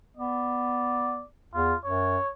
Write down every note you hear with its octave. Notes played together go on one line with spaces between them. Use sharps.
B3 D5
E2 F4
F#2 C#5